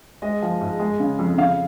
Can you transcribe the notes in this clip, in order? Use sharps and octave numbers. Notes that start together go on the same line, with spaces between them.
G#3 D#5
F3
G#2
G#3
C#3
F2
C#3 F5